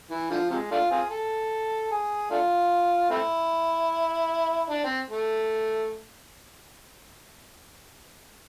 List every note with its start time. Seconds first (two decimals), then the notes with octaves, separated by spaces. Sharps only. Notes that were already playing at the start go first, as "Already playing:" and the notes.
0.10 E3
0.30 D3 F3
0.50 C3 F3 G#3
0.71 A3 D4 F4
0.91 C4 F4 G#4
1.10 A4
1.91 G#4
2.30 A3 D4 F4
3.10 A3 C4 E4
4.70 D4
4.85 C4
5.10 A3